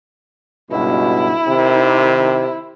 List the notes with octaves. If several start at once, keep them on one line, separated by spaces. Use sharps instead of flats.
C#2 G2 B2 E4
C3 D#3